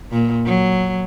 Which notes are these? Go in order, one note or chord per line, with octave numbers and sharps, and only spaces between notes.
A#2
F#3